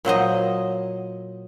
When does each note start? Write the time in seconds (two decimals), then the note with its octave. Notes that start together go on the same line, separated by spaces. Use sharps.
0.05 A#2 F#3 C5 D#5